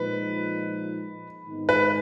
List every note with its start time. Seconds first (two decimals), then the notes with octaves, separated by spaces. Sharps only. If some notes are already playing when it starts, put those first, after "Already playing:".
Already playing: A#2 F3 G#3 D#4 B4
1.45 G#2 D#3 G#3 B3 D#4
1.69 B4